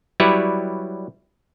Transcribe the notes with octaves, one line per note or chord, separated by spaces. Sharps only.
F#3 G3 E4 B4 C#5 D5